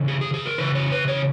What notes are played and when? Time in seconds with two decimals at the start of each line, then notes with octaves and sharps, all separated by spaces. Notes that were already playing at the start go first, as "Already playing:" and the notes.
Already playing: C#3 E3
0.08 G#4
0.21 G#4
0.34 G#4
0.46 A#4
0.58 C#3 E3 B4
0.75 C#5
0.92 B4
1.08 C#5